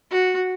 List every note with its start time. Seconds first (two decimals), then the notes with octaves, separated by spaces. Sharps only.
0.10 F#4